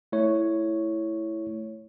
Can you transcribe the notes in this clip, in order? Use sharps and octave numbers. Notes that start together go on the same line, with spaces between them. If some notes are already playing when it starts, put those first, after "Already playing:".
A3 E4 C#5